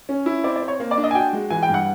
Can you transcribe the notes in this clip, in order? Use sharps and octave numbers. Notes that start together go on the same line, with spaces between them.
C#4
E4
C4 D5
D5
C4
C#5
A#3
D5
D4
D#5
G#5
F#4 G5
G#3
E3 G#5
G5
G2
F#5